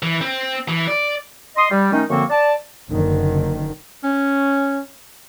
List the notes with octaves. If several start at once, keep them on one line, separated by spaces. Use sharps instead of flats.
E3
C4
E3
D5
D#5 C6 D#6
G3
D#3 A3 C#4 D#4
F#2 D3 F3 A#3 C4 C#6
D5 A5
F#1 D3 D#3
C#4